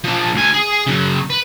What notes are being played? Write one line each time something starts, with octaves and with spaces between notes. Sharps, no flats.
F3 D4
D2 G#5
G#4
C#3 F#3
B4